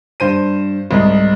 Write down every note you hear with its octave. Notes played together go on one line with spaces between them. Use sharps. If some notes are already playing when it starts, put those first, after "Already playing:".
G2 C5 D#7
C2 G#2 D#4